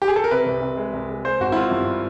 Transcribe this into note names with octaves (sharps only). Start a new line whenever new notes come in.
G4
G#4
A4
A#4
C3 B4
C2
C3
G#3
C2
G#3
G#3 C5
G#1 F#4
E4
G#3 F4
G2